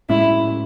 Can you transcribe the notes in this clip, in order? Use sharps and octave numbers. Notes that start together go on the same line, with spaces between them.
A2 G#3 C#4 E4